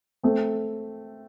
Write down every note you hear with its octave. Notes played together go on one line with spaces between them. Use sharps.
A3 C4